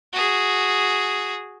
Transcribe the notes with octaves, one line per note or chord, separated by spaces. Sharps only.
F#4 G#4